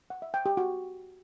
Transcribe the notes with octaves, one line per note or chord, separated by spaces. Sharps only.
F#5
E5
G5
G4
F#4